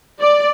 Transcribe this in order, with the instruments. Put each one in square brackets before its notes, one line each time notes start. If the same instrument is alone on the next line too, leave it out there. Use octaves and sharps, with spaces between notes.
[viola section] D5